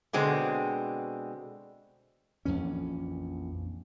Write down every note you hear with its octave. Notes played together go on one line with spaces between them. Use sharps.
B2 D3 G#3 C4
A#1 F2 E3 C#4